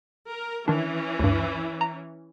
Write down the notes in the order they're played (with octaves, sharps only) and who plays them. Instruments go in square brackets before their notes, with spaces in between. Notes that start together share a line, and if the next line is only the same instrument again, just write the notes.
[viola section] A#4
[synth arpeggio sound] D#3 D4 [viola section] E3 C#4
[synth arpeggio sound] D2 G2
A#5